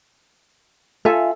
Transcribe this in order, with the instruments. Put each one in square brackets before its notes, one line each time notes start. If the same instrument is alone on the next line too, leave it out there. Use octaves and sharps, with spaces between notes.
[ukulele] F4 E5 G#5 [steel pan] A4